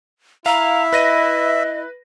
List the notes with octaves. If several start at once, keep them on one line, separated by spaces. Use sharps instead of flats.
E4 E5 F5 A#5
B4 D#5 A#6 D#7